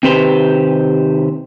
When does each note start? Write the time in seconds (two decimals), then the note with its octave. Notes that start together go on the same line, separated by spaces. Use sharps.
0.03 C3 D#3 C4 G4 B4 C5